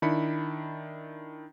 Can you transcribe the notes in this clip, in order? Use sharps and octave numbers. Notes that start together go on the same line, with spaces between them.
D#3 D4 E4 B5 C#7